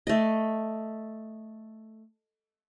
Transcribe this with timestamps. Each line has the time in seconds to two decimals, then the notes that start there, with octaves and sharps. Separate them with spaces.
0.07 A3 D#5